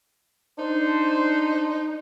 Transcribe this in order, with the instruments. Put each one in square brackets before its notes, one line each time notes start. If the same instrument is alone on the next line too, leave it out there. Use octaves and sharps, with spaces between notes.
[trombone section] D4 C5 [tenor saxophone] D#4